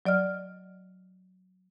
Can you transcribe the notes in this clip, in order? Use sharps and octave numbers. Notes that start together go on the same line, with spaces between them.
F#3 D5 D#5 F6